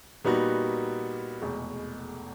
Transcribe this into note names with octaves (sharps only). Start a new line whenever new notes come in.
A#2 G3 B3 D#4 F#4
F1 E2 B2 G#3